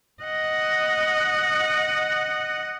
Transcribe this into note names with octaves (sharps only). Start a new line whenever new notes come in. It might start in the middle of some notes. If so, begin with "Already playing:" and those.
D#5 F#5